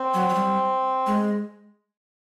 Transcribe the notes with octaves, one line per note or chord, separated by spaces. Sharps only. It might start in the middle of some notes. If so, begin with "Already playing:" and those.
Already playing: C4
F#3
F#3
G3
G#3